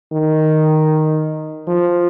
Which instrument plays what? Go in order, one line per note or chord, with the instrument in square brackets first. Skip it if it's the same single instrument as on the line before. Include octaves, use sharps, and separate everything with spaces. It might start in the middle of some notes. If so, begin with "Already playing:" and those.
[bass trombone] D#3
F3